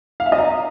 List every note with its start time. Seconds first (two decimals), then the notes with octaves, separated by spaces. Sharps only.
0.20 F5
0.26 E5
0.32 D#5
0.38 A#5